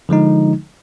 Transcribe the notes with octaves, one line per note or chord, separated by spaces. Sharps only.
D3 F3 G#3 D#4